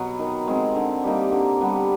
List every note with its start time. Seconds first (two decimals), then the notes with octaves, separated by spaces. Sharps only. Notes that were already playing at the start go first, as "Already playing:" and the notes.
Already playing: B2 F#3 B3
0.19 D#3
0.47 G#3 C4
0.75 D3
1.04 G3 A#3 D#4
1.32 D3
1.61 G3 B3 D4